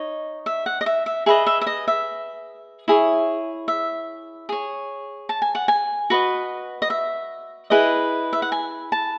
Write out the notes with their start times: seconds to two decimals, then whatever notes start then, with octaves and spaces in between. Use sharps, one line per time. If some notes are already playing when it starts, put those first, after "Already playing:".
Already playing: D#4 C#5 D#5
0.46 E5
0.66 F#5
0.81 D#5
0.86 E5
1.06 E5
1.26 G#4 B4 D#5 E5
1.47 E5
1.61 E5
1.67 D#5
1.88 E5
2.88 E4 G#4 C#5
3.68 E5
4.49 G#4 C#5
5.29 A5
5.42 G#5
5.55 F#5
5.68 G#5
6.10 F#4 B4 D#5
6.82 D#5
6.90 E5
7.70 E4 G#4 B4 D#5
8.33 E5
8.42 F#5
8.52 G#5
8.92 A5